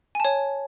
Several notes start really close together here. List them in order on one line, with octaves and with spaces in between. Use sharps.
G#5 A5 C#5